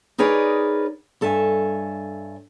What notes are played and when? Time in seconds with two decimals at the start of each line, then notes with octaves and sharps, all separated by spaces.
0.18 D#4 G#4 A#4 B4 C#5 D5
1.21 G2 A4 C#5 E5 G#5